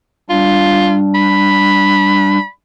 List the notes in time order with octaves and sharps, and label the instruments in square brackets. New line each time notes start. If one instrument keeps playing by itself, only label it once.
[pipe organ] G3 D4 [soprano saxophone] F4
[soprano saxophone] B5